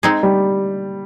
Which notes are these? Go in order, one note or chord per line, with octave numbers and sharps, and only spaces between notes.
G#3 C4 D#4 G#4
G3